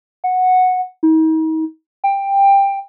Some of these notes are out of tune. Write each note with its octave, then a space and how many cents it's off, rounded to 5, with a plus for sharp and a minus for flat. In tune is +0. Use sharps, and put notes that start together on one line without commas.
F#5 -5
D#4 +40
G5 +15